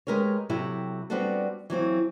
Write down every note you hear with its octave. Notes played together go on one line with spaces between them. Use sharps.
G#3 G4 A#4 B4 C#5
C3 F#3 E4 G4 A4
G3 B3 C4 D4 F#4 A4
E3 F#3 C4 F4